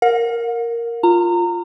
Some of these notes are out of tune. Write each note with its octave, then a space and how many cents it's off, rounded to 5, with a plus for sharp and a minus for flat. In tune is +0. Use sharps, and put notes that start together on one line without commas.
A#4 +0 F#5 -45
F4 +0 A#5 -25